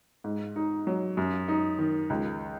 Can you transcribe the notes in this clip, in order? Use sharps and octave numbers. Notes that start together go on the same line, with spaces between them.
G#2
D#4
F#3
F#2
D#4
D#3
C#2